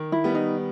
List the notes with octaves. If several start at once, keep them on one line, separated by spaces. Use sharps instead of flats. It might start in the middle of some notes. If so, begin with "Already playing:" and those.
Already playing: D#3
E4
G3 B3
D#4